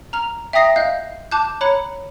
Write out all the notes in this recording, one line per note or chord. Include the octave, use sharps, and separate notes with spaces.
A#5 F6 F7
E5 G5 A#5 D#6 A#6 C7
D#5 F5 F#6 G6 C7
A5 D6 F#6 G6
C#5 A#5 B5 F#6 C#7